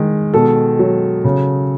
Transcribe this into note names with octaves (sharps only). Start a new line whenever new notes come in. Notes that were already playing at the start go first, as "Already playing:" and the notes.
Already playing: D#3 G#3
B2 A4
F#3
C#3